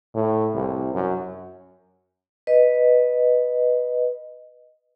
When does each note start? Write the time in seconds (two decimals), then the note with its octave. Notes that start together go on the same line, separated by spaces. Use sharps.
0.14 A2
0.54 C2
0.94 F#2
2.47 B4 D#5